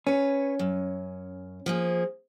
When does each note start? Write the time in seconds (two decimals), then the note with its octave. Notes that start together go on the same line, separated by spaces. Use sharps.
0.07 C#4 B4 C#5
0.59 F#2
1.66 F3 A#3 G#4